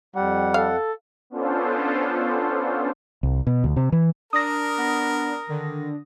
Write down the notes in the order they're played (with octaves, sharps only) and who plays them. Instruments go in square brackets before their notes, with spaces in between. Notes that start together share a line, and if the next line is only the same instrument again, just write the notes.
[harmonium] F2 F#5 [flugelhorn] G3
[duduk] A4 [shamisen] F5
[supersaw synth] B3 C#4 D4 F4 A4 C5
[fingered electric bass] C2
B2
D2
C3
E3
[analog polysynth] D4 [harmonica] A#4 [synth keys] D#6 A#6
[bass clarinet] B3
[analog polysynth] D3 [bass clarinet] D#3